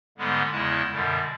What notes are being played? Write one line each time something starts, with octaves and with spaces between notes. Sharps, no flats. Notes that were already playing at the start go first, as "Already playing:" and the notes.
G#2 D3 G3 G#3 B3
E2 C#3 G#3 E4 A5
F#2 B2 D3 G3